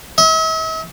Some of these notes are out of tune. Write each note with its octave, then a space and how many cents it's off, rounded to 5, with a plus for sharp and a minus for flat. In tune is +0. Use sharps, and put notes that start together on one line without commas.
E5 -45